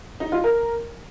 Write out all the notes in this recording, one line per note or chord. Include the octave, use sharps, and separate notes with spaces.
D#4
F4
A#4